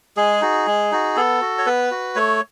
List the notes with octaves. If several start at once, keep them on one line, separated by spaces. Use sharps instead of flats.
G#3 G#4
D#4 F#4
G#3
D#4 F#4
B3 A4
F#4
C#5
B3 B4
F#4
A3 C#5